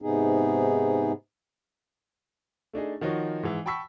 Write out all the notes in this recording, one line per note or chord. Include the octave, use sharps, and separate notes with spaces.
G#2 C3 B3 D#4 G#4
A3 D4 D#4 G#4
D#3 F3 D#4 F#4 C#5
G#2 E3
G5 A5 B5 C#6 E6 B6